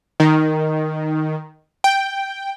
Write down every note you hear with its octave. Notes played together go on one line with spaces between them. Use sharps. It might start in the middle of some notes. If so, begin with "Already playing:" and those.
D#3
G5